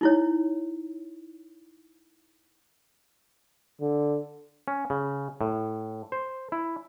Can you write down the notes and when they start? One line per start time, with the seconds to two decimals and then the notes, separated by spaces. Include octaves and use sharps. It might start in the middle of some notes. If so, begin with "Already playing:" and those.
0.01 D#4 E4 C#5
3.81 D3
4.68 C#4
4.90 C#3
5.41 A2
6.12 C5
6.52 E4